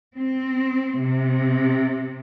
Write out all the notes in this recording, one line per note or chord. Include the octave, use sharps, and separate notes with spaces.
C4
C3